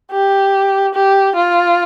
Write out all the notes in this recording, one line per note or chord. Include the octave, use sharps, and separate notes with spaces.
G4
G4
F4